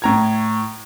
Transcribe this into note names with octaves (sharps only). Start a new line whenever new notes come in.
A2 A#5 G#6